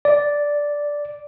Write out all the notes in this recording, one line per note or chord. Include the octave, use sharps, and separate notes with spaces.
D5